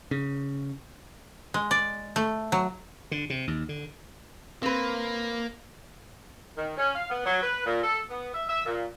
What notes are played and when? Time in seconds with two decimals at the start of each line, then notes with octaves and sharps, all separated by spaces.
0.11 C#3
1.54 G#3
1.71 D5
2.16 A3
2.52 F#3
3.11 D3
3.30 C3
3.47 D#2
3.69 D3
4.63 A#3 C4 B4
6.57 D#3
6.77 C#4
6.94 F5
7.09 B3
7.25 F#3
7.42 B4
7.65 A#2
7.83 A4
8.09 B3
8.33 E5
8.49 E5
8.66 A#2